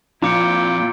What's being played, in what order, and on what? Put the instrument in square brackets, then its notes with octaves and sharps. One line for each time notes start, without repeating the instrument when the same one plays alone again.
[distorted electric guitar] F2 C4 [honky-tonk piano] A#2 [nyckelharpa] E4 G5 [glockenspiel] A#5 D6 C#7